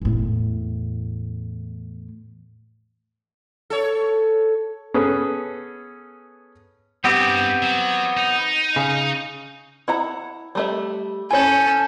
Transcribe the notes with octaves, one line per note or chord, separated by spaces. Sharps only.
E2 A2
A4 C#5
B3 C#4 G#4 A4 B4
G2 B3 C4 G4
F#3
D#4
C#3
E4 F#5 A#5
G3 A3 E5
C#4 E4 A4 C#5 G#5 G6